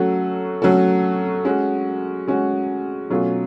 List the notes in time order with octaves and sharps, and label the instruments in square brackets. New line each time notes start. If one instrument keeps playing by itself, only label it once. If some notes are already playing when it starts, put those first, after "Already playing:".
Already playing: [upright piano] F#3 A3 C#4 F#4 A4
F#3 A3 C#4 F#4 A4
G#3 C#4 F#4
G#3 C#4 F#4
B2 F#3 A3 C#4 F4